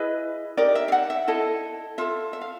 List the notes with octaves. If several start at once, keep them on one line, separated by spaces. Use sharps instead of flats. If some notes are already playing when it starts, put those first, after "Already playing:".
Already playing: E4 G#4 B4 D#5
D#4 G4 A#4 D5
E5
F5
F#5
E5
E4 A4 D#5
F4 A4 E5
E5
F5